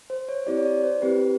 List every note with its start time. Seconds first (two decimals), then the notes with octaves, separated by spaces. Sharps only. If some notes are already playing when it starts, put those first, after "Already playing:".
0.10 C5
0.29 C#5
0.47 C4 E4 G4 D5
0.57 C#5
0.65 D5
0.83 C5
1.02 C4 E4 G4 B4